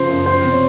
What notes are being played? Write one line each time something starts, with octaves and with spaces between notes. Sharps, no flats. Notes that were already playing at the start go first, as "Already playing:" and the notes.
Already playing: C#3 F3 C5
F#2
F3 C5
C3
C#5